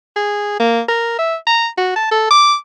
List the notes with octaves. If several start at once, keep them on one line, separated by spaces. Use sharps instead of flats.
G#4
A#3
A#4
E5
A#5
F#4
A5
A4
D6